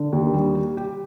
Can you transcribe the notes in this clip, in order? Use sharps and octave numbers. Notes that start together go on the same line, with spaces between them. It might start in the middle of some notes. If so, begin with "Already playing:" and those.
Already playing: D3
D#2
G3
G4
G4